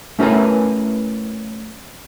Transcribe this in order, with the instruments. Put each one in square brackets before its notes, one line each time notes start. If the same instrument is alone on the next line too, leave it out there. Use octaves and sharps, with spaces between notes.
[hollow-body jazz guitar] A3 C#4 E4 A#4 B4 G#5